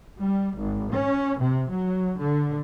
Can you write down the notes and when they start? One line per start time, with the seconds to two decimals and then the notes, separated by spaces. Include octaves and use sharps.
0.21 G3
0.58 G#1
0.93 C#4
1.40 C3
1.71 F#3
2.20 D3